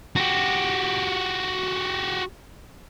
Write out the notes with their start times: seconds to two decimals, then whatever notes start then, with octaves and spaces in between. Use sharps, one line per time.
0.16 F#4 G4